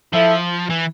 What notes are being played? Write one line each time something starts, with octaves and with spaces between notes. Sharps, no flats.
F3 E4 A4 E5
E3